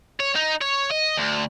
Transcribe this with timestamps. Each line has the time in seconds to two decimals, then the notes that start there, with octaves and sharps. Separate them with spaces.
0.20 C#5
0.35 D#4
0.61 C#5
0.91 D#5
1.17 D2